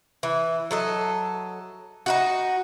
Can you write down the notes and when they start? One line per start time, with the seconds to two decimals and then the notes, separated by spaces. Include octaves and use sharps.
0.23 E3
0.71 F#3 A4 D#5
2.06 D#4 E4 F#4